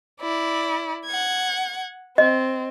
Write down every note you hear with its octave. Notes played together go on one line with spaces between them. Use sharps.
E4 D5
F#5 G#6
C4 D#5